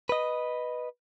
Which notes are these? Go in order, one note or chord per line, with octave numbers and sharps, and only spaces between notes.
B4 D#5